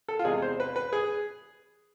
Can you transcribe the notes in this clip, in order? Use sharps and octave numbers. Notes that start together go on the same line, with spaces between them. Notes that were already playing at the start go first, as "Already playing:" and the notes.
A4
F4
E2 C3 G#3 G#4
C5
B4
B4
G#4